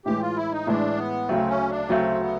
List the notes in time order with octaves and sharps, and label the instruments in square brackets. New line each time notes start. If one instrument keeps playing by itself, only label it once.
[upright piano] A2 E3 G#3 [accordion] G4
[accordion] F4
E4
D#4
[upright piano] A2 E3 G#3 [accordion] D4
[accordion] B3
[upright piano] D2 C#3 F#3 A3 [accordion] C4
[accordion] C#4
D4
[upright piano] D2 C#3 F#3 A3 [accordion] C4
[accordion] B3